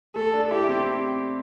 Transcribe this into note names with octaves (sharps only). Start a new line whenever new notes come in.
A3 A4
D4
E4 G4
C4